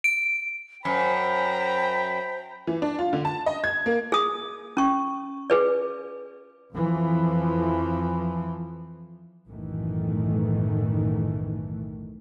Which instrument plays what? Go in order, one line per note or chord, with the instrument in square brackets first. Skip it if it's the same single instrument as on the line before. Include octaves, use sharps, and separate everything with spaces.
[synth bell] D7
[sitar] F#2 [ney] C5 [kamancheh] G5 A#5 [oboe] B5
[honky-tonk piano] E3
D4
F4
D3
A5
D#5
G#6
A#3
[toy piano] G#4 D#6
C#4 C#6
G#4 B4 D5
[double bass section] F2 E3 F3
B1 F#2 A2 D#3 E3 A3